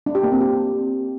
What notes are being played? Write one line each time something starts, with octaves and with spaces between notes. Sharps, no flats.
D4
G4
A#3
C4
G4